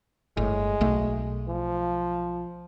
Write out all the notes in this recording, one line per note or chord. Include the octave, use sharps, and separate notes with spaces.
G1 A2 G#3
B1 A3
F3